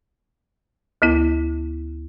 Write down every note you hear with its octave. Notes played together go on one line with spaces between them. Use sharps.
D2 B3 E4